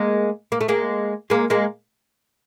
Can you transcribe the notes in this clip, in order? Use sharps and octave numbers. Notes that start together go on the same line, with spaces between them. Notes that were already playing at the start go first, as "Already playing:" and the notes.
Already playing: G#3 A#3
A#3
A3
G#3 A#3
G#3 A#3
G#3 A#3